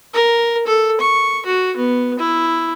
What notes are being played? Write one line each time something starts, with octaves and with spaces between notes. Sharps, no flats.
A#4
A4
C#6
F#4
B3
E4